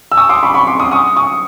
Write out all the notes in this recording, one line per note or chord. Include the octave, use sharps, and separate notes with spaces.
E6
C#6 D#6
C6 D6
B5 C#6
B5 C#6
C6 D6
C#6 D#6
C#6 D#6
C#6 D#6